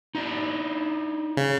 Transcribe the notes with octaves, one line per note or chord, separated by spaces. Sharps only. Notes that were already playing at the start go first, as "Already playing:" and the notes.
D#4 E4 D5
C#3